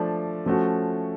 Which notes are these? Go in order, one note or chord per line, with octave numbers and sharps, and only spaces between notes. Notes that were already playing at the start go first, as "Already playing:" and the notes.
Already playing: F3 A3 D4
F3 A3 C#4 F#4